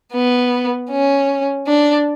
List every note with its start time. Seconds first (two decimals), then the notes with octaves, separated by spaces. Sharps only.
0.13 B3
0.90 C#4
1.67 D4